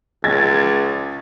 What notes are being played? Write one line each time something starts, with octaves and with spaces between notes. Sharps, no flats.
C#2 G#6 A6